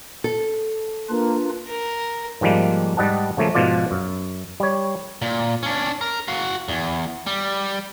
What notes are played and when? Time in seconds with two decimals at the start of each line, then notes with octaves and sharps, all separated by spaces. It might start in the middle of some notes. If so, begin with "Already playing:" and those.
0.24 A4
1.09 A#3 D4 F4 B4
1.68 A#4
2.41 G#2 D#3 F3 G3 G#3 A#3
2.97 G#2 G3 D#5 F#5 A5
3.37 C#3 F3 A3 A#3
3.55 G#2 B2 F3 F4 D5
3.91 F#2
4.60 G3 C#5
5.22 A#2
5.63 C#4 D4
6.01 A#4
6.28 F#4 F5
6.68 E2
7.27 G3